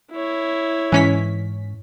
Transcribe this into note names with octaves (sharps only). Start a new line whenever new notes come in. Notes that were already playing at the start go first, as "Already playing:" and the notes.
E4 C#5
G#2 E3 C#4 B6